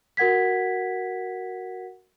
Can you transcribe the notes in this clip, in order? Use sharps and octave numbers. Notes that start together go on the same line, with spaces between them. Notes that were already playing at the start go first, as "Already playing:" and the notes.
F#4 A#4 F#5 G#6 B6